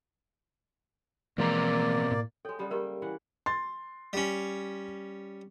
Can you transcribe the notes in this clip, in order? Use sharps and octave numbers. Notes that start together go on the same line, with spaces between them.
B2 E3 F3 G#3 A#3 C4 D5 A#5
A2
G#3 A4 C#5 G5
C#3 G3 B3
A#3 G4 A#4 E5 G5
E3 F#5
C6 A6
G3 C#4